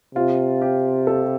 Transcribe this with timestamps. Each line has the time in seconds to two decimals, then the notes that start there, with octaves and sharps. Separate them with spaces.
0.15 C3 F4
0.62 G4
1.07 A4